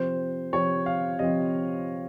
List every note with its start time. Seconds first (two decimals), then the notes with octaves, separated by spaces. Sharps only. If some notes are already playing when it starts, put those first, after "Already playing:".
Already playing: C3 F3 C4 C5
0.53 C3 F3 C4 C#5
0.86 F5
1.19 C3 F3 C4 D#5